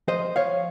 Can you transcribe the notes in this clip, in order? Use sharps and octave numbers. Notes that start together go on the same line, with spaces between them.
F3 C5 D#5
F3 C#5 F5